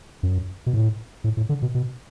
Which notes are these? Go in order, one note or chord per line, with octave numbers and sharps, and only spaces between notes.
F#2
B2
A2
A2
A2
D3
B2
B2